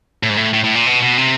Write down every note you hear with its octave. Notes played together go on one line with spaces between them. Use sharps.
A2
G#2
A2
A2
A2
A#2
B2
B2
C3